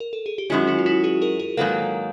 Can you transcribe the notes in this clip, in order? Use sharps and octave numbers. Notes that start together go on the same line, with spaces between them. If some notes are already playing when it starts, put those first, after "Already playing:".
A#4
A4
G#4
G4
F#2 D#3 G#3 C#4 E4 F#4
E4 F#4
F4
E4 F#4
F#4 G#4
G#4 A#4
G#4 A#4
G#2 D#3 F#3 A#3 A4 B4